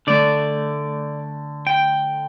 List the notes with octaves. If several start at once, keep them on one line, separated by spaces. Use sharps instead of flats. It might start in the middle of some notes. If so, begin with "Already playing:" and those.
D3 A3 D5
G5